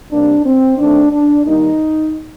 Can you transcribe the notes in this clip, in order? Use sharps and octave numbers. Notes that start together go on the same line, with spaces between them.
C3 G3 A#3 D4
C4
D#3 A3 C4 D4
D4
D#3 G3 A#3 D#4